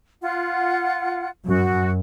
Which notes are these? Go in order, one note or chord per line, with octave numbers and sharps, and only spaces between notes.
F4 F#5
F#2 F#4